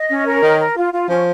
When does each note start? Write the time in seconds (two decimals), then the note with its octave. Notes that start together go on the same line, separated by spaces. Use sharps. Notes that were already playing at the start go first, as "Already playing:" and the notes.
Already playing: D#5
0.08 C#4
0.25 A#4
0.42 D#3 C#5
0.59 A#4
0.76 F4
0.93 F4
1.09 F3 C#4